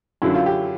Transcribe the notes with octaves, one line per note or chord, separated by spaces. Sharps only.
F#2 D3 F#3 E4
F4
G4